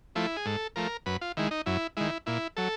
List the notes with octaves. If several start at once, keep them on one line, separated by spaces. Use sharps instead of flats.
F3 A3 E4
G#4
G#2 A4
F3 A3 A#4
F#2 B4
F4
D#3 G#3 E4
D#4
F#2 E4
D#3 G#3 E4
A#2 E4
F#3 A4